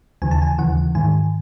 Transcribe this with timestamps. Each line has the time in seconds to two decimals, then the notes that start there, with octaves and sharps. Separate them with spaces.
0.22 D#2 C#3 E3 G#5
0.31 A5
0.42 G#5
0.58 D#2 C#3 E3 F#5
0.95 G#2 D#3 G#5